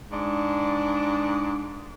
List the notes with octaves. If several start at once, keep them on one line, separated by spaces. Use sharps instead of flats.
G#2 D4